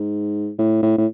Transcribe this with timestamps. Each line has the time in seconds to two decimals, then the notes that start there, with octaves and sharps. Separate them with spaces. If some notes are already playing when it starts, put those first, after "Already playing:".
Already playing: G#2
0.59 A2
0.83 A2
0.98 A2